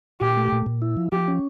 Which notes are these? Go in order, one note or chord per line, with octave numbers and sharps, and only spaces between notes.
A#2 G4
A3
A#2
A#2
E4
F3
F3 G4
C#4